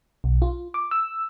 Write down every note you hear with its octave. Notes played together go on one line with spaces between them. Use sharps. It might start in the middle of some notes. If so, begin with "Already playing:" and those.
B1
F4
D6
E6